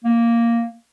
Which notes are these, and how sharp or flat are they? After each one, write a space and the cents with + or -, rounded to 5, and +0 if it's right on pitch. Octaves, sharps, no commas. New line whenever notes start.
A#3 +0